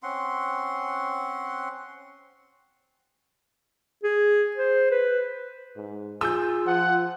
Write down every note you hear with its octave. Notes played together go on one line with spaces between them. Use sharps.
C4 C#4 F#5 C6
G#4
C5
B4
G#2
F4 G#4 E6 G6
F3 F#5